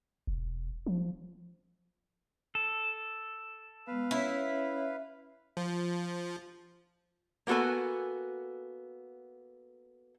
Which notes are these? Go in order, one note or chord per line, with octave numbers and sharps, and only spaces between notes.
E1
F3
A4
G#3 B3 B4 F5
C#4 E4 C#5
F3
A#3 B3 F#4 A4 G#5